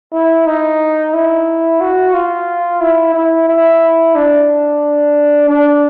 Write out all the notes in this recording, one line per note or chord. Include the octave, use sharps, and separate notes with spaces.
E4
D#4
E4
F#4
F4
E4
E4
E4
D4
D4